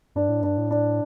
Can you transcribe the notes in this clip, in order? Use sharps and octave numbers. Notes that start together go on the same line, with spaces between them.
G2 D4
A2
G2 D4
A2
D4